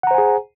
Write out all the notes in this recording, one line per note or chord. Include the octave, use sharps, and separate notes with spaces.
G#4 C5 F#5 G#5 A#5